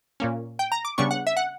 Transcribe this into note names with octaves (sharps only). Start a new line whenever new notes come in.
A#2 A#3 C#4
G5
A#5
D6
C#3 G3 B3 D4 C#6
F#5
E5
F#5